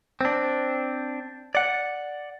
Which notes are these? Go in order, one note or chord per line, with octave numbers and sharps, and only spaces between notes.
C4 D4
D5 F#5